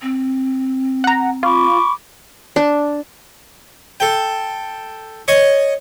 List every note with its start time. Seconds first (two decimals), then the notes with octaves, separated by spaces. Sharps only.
0.02 C4
1.04 F#5 A#5
1.43 F4 B5 C#6 D6
2.56 D4
4.00 A4 G5
5.28 C#5 D#5 C#6